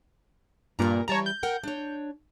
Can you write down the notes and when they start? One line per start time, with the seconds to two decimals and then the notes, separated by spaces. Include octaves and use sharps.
0.79 G2 A#2 A#4 A#5
1.08 E3 G3 C#5 A5 A#5
1.26 G6
1.43 A#4 F#5 G5
1.64 D4 C#5